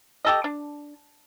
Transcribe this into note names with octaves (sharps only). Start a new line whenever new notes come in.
G4 A4 D#5
D4